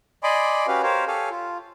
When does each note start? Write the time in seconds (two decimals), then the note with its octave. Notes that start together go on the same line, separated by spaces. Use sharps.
0.23 D5 D#5 G#5 B5 C6 D6
0.67 C#4 F#4 G4 B4 F5
0.83 G4 A#4 C5 C#5 F5
1.07 G4 A4 C#5 F5 G#5
1.30 F4